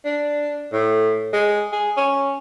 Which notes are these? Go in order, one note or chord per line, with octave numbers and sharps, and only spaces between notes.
D4
A2
G#3
G#4
C#4